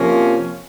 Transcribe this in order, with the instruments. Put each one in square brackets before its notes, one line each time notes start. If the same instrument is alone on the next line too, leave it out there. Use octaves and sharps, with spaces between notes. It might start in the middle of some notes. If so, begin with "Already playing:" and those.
Already playing: [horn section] C3 F3 A#3 C#4